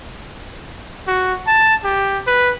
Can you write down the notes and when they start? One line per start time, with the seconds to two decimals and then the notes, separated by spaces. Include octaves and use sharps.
1.08 F#4
1.47 A5
1.84 G4
2.27 B4